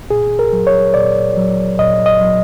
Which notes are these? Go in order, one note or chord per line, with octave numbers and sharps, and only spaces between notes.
A#2 G#4
A#4
F#3
C#5
A#2 D5
F#3
A#2 D#5
D#5
F#3